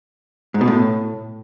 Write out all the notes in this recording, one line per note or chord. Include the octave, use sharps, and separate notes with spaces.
G#2
B2
A2